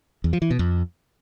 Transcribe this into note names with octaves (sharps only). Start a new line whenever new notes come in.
E2
F3
E3
B2
F2